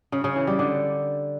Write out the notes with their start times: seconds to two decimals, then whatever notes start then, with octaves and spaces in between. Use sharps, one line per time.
0.12 C#3
0.24 C#3
0.36 E3
0.47 G3
0.59 D3